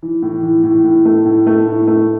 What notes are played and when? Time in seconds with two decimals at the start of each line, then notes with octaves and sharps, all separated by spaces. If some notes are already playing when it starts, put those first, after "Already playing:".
0.03 E3
0.23 A2
0.43 E3
0.64 A2
0.84 A2
1.05 A3
1.25 A2
1.47 A3
1.67 A2
1.87 A3